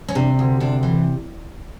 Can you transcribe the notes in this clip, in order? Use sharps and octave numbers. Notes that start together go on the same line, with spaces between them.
C#4
C3 D4
D2
C3 D4
E3